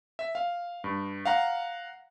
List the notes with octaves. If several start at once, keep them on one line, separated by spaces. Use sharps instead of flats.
E5
F5
G2
F5 F#5 A#5